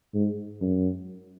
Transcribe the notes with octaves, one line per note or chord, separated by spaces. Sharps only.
G#2
F#2